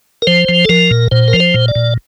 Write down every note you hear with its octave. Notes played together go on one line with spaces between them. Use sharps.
A#4
F3 C5
F3
A4
F3 A#4
A#2
A#2 C5
A#4
F3
C5
A#2
D5
A#2